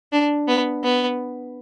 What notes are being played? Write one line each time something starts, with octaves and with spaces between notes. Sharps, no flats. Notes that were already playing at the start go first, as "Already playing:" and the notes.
D4
B3
B3